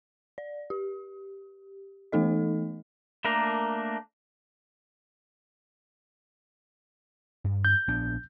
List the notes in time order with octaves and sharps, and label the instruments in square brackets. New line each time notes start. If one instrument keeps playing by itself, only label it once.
[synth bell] D5
G4
E3 A3 B3 D#4 A4 D#5
[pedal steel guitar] A3 A#3 D4 A#4
[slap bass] G2
[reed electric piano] G6
[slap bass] A#1 B3 D4